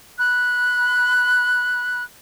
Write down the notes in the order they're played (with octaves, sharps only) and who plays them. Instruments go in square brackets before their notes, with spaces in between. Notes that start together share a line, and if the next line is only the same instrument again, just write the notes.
[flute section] B5 F#6